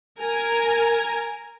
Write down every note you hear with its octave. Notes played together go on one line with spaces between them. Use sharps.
A#4 G#5 A#5